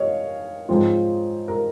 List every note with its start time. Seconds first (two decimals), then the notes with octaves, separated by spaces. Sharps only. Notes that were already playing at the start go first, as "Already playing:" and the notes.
Already playing: C#5 D#5 F5
0.69 G#2 F3 C4 F4
1.48 A#4